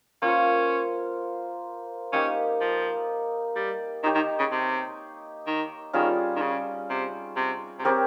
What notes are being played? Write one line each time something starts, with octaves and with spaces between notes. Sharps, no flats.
A#3 C#4 F4 C5
A#3 C#4 D#4 G4
F3
G3
D#3 D#4 G4 C#5
D#3
C#3
C3
D#3
D#3 G3 C#4 F4 G#4
D#3
C#3
C3
C3
C3
C#3 C4 G4 A#4 C#5